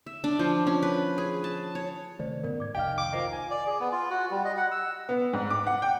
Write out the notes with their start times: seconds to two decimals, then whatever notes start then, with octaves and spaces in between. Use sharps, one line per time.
0.06 E5
0.24 D4
0.39 F3
0.67 C#4
0.82 B4
1.18 G#4
1.44 A5
1.75 C#5
2.19 C3 D#3 A3 C5 D5
2.44 G#2 C#3 B3 A#4 D5
2.60 G#2 D6 G#6
2.75 F1 C2 D#3 D#5 F5 G5 F6
2.98 G5 D6
3.12 A#3 F4 C5 D#5
3.32 G#5
3.51 D5
3.67 G#4
3.80 B3
3.92 F4
4.10 F#4
4.31 G3
4.45 D#5
4.57 F#5
4.71 E6
5.09 B3
5.33 G#2
5.50 D6
5.67 F#5
5.82 G5